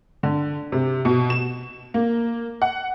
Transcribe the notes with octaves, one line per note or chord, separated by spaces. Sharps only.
D3
C3
B2
E7
A#3
F#5